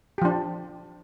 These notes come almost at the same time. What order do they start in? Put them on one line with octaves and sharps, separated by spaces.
G4 F3 D4